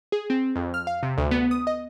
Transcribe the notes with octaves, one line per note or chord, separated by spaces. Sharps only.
G#4
C4
F2
F6
F5
C3
D2
B3
D#6
D#5